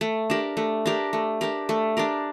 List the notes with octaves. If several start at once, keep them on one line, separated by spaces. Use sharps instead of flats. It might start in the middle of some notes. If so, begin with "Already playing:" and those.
A3
D4 G4 A#4
A3
D4 G4 A#4
A3
D4 G4 A#4
A3
D4 G4 A#4